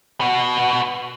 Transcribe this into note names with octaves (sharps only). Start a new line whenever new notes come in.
B3 F#4